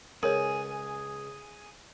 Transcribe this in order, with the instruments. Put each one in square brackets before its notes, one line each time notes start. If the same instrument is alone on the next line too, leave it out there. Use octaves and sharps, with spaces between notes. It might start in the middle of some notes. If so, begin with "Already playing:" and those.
[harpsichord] C#2 [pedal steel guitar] G#4 G#5 [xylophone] A#4 C#5